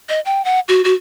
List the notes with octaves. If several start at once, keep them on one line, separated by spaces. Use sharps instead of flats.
D#5
G5
F#5
F#4
F#4